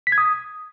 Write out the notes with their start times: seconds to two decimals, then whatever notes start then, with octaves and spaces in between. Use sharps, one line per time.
0.07 B6
0.12 G#6
0.18 D#6